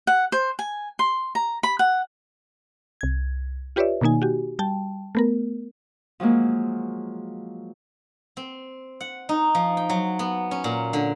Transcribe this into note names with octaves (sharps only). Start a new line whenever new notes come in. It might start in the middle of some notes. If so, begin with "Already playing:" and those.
F#5
C5
G#5
C6
A#5
B5
F#5
C2 G#6
F4 G4 B4 C#5 D5 E5
B2 D#3 A#3 D#4 G#5
F#4 G4
G3 G5 A5
A3 B3 A#4
F3 F#3 G#3 A#3
C4
F#5
D#4
F3
G5
F#3
B3
C#4
A#2
D3